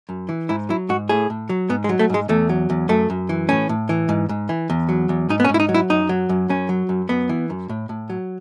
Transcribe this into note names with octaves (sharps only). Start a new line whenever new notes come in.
F#2
E3
G#2 E4
F#3 E4
G#2 F#4
A2 G#4
A2
F#3
G#2 B3
G#3
F#3
A3
G#2 G#3
E2 A3
F#3
E2
F#2 A3
F#2
E3
A2 C#4
A2
E3
G#2
G#2
E3
E2
F#3
E2
G#2 D#4
B3
C#4
G#2
E4
D#4
F#3
E4
F#2 D#4
F#3
F#2
F#2 C#4
F#3
F#2
F#2 B3
E3
F#2
A2
A2
F#3